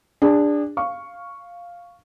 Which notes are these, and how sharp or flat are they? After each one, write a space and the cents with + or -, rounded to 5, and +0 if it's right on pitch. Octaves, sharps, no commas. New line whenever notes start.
D4 +0 G#4 -30
F5 +0 C#6 +0